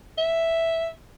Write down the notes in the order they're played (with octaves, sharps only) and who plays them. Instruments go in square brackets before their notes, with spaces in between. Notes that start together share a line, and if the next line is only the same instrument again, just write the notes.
[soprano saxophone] E5